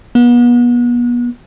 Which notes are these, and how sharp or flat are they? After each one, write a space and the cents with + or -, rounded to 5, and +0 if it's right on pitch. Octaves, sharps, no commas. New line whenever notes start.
B3 -35